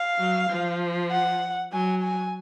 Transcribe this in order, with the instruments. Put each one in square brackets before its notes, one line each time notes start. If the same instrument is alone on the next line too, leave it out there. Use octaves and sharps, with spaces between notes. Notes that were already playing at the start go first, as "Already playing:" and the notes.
Already playing: [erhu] F5
[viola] F#3
F3
[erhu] F#5
[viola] F#3 [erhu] G#5
[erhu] G#5